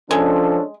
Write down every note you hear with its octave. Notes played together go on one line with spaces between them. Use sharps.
F3 G#3 C#4 D4 A4